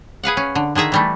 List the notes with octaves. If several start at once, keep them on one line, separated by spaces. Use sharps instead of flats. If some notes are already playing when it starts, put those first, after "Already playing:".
G#4 B4 F5 F#5
C#4
D3
D3 D#3 G#4 E5 A#5
E3 G3 A3